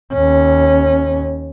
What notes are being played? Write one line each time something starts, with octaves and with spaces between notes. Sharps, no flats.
D#2 C#4